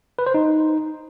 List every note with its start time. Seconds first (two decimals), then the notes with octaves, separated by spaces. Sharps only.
0.19 B4
0.26 C5
0.34 D#4